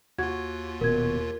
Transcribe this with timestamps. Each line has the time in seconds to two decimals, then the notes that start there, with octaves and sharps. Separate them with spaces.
0.18 D#2 F4 F#4 G#6
0.81 D#1 B2 A#4 G#6